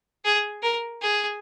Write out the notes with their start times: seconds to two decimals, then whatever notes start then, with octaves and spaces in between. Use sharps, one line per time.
0.25 G#4
0.63 A#4
1.02 G#4